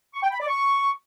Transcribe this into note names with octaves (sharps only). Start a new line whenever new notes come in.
C#6
G5
B5
D5
C#6